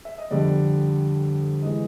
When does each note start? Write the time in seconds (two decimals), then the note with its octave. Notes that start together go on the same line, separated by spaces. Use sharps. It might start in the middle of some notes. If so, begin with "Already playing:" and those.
0.05 E5
0.18 D#5
0.31 F2 D3 G3 D5
1.62 E3 G#3 D#5